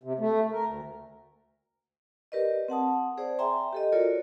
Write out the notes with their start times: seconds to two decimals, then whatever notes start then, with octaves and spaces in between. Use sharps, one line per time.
0.03 C3
0.19 A3
0.52 A#4
0.65 D2
2.32 G4 A#4 B4 D5 D#5
2.68 C4 F#5 A5 D#6
3.18 G#4 C5 D5
3.39 E5 G5 G#5 A#5 C6
3.73 G4 A4 D#5
3.92 F4 F#4 A4 A#4 C#5 D5